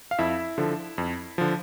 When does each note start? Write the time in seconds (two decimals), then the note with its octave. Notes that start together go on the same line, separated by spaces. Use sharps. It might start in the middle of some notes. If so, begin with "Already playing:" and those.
0.11 F5
0.18 F2 E4 E5
0.58 D3 F3
0.98 F2
1.38 D3 F3